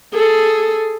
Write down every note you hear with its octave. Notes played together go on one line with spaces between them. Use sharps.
G#4 A4